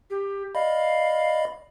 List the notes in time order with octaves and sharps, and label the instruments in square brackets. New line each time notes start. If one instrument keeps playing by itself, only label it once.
[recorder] G4
[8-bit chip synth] D5 D#5 B5 [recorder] F5